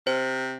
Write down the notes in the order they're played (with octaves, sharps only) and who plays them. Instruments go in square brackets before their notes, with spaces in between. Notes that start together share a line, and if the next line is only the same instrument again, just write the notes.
[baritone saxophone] C3 [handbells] C5